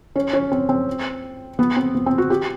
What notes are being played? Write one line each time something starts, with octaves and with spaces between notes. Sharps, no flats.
C#4
C#4
C4
C4
B3
C4
B3
C4
F#4
G4